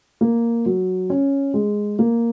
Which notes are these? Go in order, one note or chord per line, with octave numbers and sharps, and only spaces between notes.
A#3
F#3
C#4
G#3
A#3